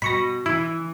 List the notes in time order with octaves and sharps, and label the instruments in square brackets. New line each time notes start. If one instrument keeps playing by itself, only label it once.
[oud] B2 [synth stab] B5 C#6 A#6
[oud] E3 [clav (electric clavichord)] E4